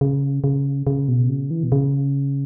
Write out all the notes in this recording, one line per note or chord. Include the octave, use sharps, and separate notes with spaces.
C#3
C#3
C#3
B2
C#3
E3
B2
C#3